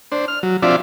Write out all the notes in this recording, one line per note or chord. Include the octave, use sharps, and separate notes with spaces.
D4 C5
F6
F#3
F3 C4 D4 F4 D5 E5